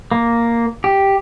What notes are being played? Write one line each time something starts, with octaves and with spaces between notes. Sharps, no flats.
A#3
G4